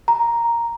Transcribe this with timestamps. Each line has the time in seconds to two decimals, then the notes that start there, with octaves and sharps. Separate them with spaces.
0.08 A#5